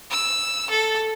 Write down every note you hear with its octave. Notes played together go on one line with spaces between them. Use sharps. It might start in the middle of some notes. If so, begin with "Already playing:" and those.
E6
A4